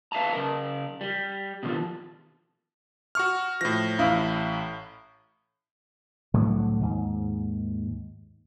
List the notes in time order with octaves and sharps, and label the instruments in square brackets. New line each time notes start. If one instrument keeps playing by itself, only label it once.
[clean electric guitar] B4 E5 F5 A5 A#5
C#3 A#4
G3
B2 D3 D#3 F3
[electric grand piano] F#4 C#6 F6
[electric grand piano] A2 A#6 [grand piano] F3
[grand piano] A1 E4 F5
[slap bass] C2 A2 D3 F#3
D#2 G#2